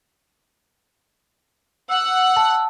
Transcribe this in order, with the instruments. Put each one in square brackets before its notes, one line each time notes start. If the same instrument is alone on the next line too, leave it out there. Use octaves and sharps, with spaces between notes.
[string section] F#5 [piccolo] E6
[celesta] A5